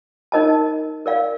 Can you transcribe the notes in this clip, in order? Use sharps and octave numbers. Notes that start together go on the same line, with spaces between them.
D#4 A#4 D#5 A5
A#4 D5 F5